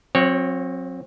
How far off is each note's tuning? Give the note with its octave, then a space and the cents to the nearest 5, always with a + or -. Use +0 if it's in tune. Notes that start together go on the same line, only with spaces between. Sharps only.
F#3 -30 C4 +20 C#5 -5